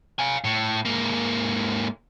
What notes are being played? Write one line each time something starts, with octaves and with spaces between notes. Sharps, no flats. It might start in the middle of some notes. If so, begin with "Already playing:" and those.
F5 G#5
A2
G#2 A#3